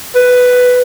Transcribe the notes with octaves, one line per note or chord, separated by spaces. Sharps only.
B4